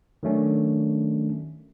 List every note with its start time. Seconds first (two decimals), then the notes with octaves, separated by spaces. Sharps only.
0.23 D#3 F#3 A3 C#4 D4